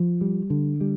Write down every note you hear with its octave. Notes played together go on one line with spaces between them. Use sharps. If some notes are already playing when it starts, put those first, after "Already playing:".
Already playing: F3
G3
D3
G3